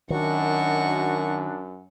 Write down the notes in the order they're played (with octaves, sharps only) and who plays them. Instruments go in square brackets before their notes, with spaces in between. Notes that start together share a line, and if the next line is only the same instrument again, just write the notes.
[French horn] F#2 [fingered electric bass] D#3 [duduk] D4 [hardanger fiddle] F#4 C#6